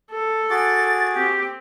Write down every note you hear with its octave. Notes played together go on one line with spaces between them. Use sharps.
A4
F#4 G#4 D6 A6
C4 G4